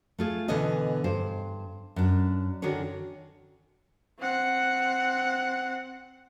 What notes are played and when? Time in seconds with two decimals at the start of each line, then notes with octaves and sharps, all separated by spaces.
0.18 A3 F4 G#4
0.48 B2 D3 E3 B3 D#5 G#5
1.04 G2 C5
1.96 F#2 D4
2.62 D3 D#3 D4 F#4 G#4 C#5
4.20 C4 F#5